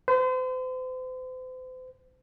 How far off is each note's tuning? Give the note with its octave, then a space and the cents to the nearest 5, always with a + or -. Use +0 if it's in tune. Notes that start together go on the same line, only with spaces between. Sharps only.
C5 -40